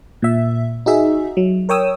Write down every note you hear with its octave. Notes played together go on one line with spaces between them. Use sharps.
A#2 E5
D#4 F#4 G#4 E5
F#3
A#4 C#5 G5 D#6 E6